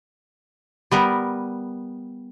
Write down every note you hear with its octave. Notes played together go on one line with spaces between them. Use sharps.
G3 B3 A#4